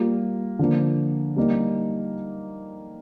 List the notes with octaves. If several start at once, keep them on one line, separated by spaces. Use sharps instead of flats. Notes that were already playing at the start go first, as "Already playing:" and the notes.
Already playing: G3 A#3 F4
D3 F3 A#3
G3 A#3 D#4